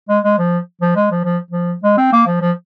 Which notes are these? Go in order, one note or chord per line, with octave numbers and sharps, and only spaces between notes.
G#3
G#3
F3
F3
G#3
F3
F3
F3
G#3
C4
A#3
F3
F3